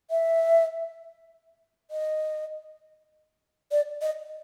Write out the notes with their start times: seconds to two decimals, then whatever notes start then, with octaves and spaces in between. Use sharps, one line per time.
0.11 E5
1.91 D#5
3.71 D5
4.02 D#5